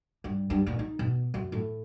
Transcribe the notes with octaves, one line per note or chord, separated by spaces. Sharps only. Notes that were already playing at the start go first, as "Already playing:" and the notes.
G2
G2
A#2
D#4
B2
F#2
A2